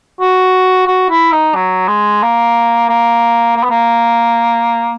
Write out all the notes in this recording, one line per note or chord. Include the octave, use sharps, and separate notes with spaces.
F#4
F#4
E4
D#4
F#3
G#3
A#3
A#3
A#3
B3
A#3